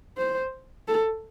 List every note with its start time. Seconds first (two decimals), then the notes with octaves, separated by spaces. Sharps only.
0.17 C5
0.88 A4